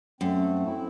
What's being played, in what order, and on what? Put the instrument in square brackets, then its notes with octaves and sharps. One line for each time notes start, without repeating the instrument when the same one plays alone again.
[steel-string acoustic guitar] F#2 [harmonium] A3 C4
[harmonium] C4 E4